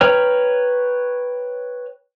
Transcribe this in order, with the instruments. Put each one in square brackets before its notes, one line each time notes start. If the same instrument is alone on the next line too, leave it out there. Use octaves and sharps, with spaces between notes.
[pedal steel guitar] B4 C#5 G5 A#5 F6